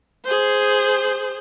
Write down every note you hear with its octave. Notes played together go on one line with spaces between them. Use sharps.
G#4 C5